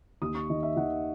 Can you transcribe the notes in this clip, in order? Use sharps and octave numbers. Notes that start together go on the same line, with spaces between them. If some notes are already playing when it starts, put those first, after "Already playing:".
D#2 D#6
C#6
D#3 D#5
E5
D#3 F#5